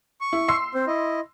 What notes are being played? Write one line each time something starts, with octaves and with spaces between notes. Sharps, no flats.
C#6
E4
C6 E6 C7
C4 C5
E4 D#5